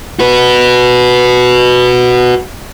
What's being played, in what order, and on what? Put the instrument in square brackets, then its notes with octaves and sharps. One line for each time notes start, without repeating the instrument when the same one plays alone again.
[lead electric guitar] F#4 B4